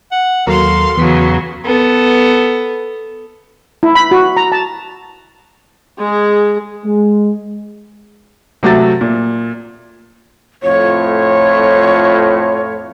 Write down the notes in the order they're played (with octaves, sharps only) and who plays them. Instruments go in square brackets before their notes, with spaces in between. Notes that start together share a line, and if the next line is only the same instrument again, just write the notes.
[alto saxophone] F#5
[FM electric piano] D#2 F#3 A#4 [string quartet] F#4 F5 C6 [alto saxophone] A4
[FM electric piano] E2 B6 [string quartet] C#3 F#3 [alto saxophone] B3
[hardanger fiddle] B3 A4
[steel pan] E4
B5
F#4
A#5
A5
[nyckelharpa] G#3 G#4
[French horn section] G#3
[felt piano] C3 F#3 A3 F#4 E5 A6
A#2
[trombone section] F2 A2 F4 [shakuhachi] C#5